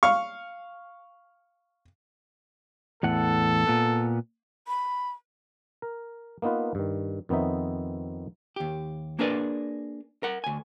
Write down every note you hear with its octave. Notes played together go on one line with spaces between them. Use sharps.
F5 C#6
E2 A2 A4 F#5
A#2 B3
B5
A#4
A#3 B3 D#4 F4 B4
G2 D#3
F2 D#3 B3 C4 D#4 E5
D#2 G4
A#3 D4 G#4 A#4 B4 D5
A#4 F#5
D2 G#5